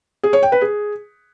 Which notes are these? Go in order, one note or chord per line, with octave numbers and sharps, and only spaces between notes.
G#4
C#5
G5
B4
G#4